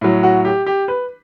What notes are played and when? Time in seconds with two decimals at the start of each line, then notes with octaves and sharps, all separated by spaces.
0.01 A2 F#3
0.23 F#4
0.45 G4
0.66 G4
0.88 B4